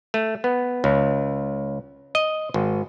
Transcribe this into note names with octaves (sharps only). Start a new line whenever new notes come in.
A3
B3
C#2
D#5
G#1